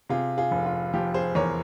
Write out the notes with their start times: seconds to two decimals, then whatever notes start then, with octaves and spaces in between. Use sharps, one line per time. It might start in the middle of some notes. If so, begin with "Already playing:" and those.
0.09 C3 F4 G#4
0.38 F4 G#4
0.51 F1
0.66 F4
0.93 F3 G4
1.14 G#4 C5
1.35 E2 A#4 C#5